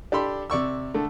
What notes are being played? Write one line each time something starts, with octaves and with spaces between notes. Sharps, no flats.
D4 G4 A4 B5 C6
C3 D5 C#6 E6
D3 A3